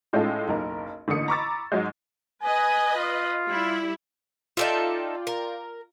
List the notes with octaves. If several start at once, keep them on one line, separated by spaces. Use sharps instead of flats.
A2 G#3 C#4 F4 A4
F#1 B1 A#4
A1 D3 A#3 D#6 C#7
A#5 B5 C#6 D6 E6 A6
G#2 F#3 G#3
B4 D#5 G#5
F4
G3 E4
D#4 F4 A4 D5 E5 G5
A#4